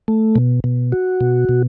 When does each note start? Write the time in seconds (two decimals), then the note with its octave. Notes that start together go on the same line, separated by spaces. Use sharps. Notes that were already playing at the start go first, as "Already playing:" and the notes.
0.08 A3
0.36 B2
0.64 B2
0.92 F#4
1.21 B2
1.49 B2